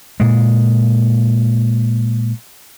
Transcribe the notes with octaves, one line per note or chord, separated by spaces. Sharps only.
A#2 G#3